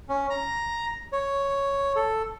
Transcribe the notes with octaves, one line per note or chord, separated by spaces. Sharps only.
C#4
A#5
C#5
A4